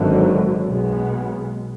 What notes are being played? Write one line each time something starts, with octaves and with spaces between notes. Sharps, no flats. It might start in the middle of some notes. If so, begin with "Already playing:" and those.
Already playing: G#1 F#2 D3 F#3
B1 B2 G#3 B3